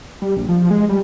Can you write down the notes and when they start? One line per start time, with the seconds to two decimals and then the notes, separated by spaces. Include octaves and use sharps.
0.22 G3
0.37 A#1
0.49 F3
0.70 G#3
0.89 G3